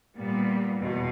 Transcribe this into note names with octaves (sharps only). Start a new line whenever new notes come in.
A#2 G3 B3
E2 B2